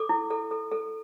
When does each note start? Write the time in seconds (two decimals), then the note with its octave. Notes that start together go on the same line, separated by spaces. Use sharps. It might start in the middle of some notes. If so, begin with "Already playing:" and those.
Already playing: A4 D6
0.09 E4
0.30 A4
0.51 A4
0.72 A4